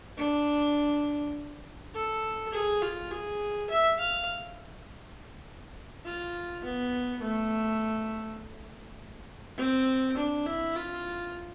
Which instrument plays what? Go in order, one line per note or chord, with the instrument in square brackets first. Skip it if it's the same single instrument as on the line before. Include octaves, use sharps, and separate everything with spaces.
[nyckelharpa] D4
A4
G#4
F4
G#4
E5
F5
F4
B3
A3
C4
D4
E4
F4